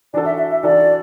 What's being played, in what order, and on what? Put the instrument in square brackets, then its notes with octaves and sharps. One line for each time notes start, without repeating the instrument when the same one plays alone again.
[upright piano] E3 D4 F#4 A4 [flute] D5
[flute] E5
E5
E5
[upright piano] E3 D4 F#4 A4 [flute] D5